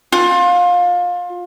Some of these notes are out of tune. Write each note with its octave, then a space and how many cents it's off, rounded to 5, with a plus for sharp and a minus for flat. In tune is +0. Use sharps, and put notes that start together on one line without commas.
F4 +25